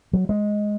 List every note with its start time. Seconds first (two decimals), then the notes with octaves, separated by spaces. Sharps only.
0.13 F#3
0.29 G#3